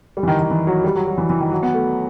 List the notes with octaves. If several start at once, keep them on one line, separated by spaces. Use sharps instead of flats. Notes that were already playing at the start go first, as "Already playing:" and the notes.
G3
E3
D#3
D#3
E3
F#3
G3
F#3
F#3
E3
E3
D#3
F#3
B3
A3